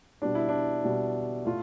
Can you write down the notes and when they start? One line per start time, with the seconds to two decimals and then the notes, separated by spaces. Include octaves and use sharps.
0.22 B2 G3 D4
0.35 E4
0.48 D4
0.84 B2 G3
1.45 A2 A3 F4